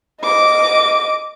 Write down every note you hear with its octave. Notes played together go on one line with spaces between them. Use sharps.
D#5 D6